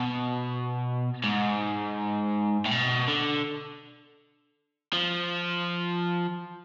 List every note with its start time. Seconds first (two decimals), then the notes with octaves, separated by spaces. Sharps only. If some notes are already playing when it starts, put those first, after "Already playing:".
Already playing: B2
1.24 G#2
2.66 A2
2.71 B2
3.08 D3
4.93 F3